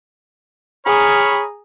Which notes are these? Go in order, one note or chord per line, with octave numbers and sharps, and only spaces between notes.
G#4 C#5 A#5 B5 F6